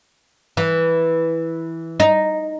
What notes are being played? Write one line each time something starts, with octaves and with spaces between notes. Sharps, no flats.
E3
D#4